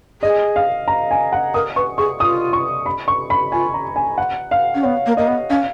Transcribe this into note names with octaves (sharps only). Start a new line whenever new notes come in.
G#4 D#5
F5
A#5
G#5
F#5
A#4 D#6
B4 C#6
G#4 C#6
F4 D#6
C#6
B5
C#6
B5
F4 G#5
A#5
G#5
F#5
F5
C#4
B3 C#5
A#3
A#3 D#5
B3
C#4 F5